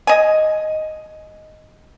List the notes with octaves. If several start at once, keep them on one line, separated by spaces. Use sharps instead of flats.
D#5 G#5